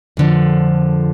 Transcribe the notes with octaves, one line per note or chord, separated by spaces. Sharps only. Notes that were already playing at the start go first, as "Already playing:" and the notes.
F2 D3 F3